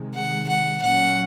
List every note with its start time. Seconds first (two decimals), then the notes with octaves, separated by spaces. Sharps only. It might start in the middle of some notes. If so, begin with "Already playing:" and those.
Already playing: C3 D#3 G#3
0.15 F#5
0.48 F#5
0.82 A#2 F#3 A#3 C#4 F#5